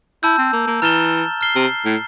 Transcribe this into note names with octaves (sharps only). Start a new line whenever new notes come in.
E4 A5 E6 G6
C4
A#3
A#3
E3 A#5 F6 A6 E7 G7
F6 C7 G7
C3
A2